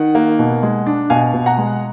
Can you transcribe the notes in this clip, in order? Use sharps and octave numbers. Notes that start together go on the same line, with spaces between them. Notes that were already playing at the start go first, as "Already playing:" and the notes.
Already playing: D#3 F#5
A#3
B2
G#3
D4
B2 F5 G#5
B2
F#5 A#5
G#3